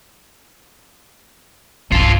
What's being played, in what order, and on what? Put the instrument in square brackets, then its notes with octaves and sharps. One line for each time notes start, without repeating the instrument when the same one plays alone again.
[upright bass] B1 G2 [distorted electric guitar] F4 A4